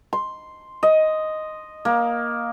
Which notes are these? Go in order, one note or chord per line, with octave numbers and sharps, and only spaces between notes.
C6
D#5
A#3